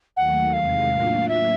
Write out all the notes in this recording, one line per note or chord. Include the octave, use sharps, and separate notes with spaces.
D#2 D#3 F#3 A3 F#5
E2 C3 D#3 G#3 F5
A2 F#3 A#3 D4 F4
E5